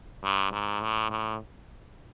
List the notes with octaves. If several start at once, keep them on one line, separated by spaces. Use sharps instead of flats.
G2
G#2
A2
A2